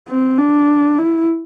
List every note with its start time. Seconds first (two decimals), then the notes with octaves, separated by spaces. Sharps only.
0.09 C4
0.39 D4
0.98 E4